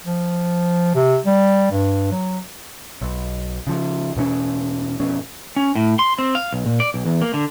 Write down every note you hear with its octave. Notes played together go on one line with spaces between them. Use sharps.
F3
C3
G3
G2
F#3
B1
C#3 F3
E2 B2 A3 C#4
F2 B2 C#4
C#4
A2
C6
C4
F5
B1
A#2
D5
B1
E2
A#3
D3